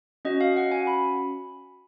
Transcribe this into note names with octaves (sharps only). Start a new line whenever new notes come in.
C#4 F#4 D#5
F5
F#5
G#5
B5